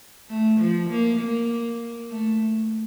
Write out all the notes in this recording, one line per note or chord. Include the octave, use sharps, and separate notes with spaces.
A3
F3
A#3
A#3
A3